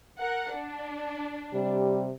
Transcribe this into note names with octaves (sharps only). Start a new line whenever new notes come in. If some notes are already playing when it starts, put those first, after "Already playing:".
A#4 F#5
D4
C3 G3